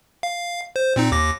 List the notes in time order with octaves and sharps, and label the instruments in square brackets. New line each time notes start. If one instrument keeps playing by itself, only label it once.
[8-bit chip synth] F5
C5
A#2 C4 D#4
D#2 D6 A#6